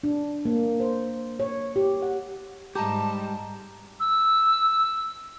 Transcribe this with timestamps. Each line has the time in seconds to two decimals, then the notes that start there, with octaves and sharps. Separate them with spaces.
0.04 D4
0.45 A#3
0.80 C5
1.40 C#5
1.76 G4
2.02 F#5
2.75 G#2 G3 G4 D#5 A5 A#5
4.00 E6